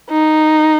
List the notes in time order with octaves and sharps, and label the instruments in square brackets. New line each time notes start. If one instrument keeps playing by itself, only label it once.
[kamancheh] D#4